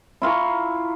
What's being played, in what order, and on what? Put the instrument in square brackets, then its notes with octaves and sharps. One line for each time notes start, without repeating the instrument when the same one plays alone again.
[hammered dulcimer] E4 F4 A#5 C#6